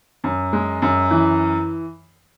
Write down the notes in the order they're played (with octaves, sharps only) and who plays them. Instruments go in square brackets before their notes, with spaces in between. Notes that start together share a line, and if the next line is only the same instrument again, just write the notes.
[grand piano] F#2
G#3
F#2
E3